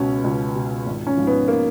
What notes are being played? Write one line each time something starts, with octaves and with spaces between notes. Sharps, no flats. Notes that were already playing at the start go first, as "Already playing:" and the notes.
Already playing: C#2 B2 C#4
C#2
B2
G#1
C#4
G#2 F3
B3
A#3